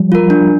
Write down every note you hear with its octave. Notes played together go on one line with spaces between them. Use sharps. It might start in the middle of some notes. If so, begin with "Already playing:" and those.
Already playing: F3 G3
F4 A#4
D4